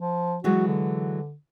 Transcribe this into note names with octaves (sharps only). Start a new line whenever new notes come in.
F3
E3 F#3 G#3 F#4
D3